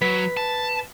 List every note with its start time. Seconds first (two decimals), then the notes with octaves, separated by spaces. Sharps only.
0.01 F#3 B4 B6
0.37 A5